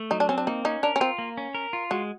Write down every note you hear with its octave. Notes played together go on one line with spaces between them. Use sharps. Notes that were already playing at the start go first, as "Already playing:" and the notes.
Already playing: A3
F#3 D#4
D4
C4 C#4
D4
A#3 D#4
C#4 D#4
D4 A#4
C#4
C4 F4
A#3
C#4
A#4
F4
G#3 F#4